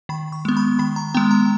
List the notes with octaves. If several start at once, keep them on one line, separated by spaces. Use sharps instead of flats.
D#3 B5
C#6
G#3 B3
B5
D#3 B5
A#5
G#3 B3 G5
A#5